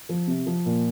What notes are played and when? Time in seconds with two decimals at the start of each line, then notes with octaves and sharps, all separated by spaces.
0.09 F3
0.27 C3
0.46 F3
0.66 A#2